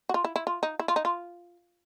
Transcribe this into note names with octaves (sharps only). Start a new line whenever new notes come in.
F#4
F4
E4
E4
F4
D#4
E4
F4
D#4
F4